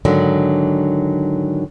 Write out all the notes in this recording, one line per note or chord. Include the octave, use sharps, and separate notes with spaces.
G#2 D3 D#3 F#3 D4